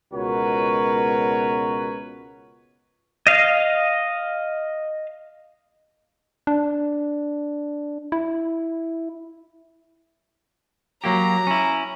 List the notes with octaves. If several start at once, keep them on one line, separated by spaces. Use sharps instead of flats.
C#2 B2 F#4 A#4 B4 C#5
D#5 F5
D4
E4
F#3 A#3 G4 A#5
C#4 E4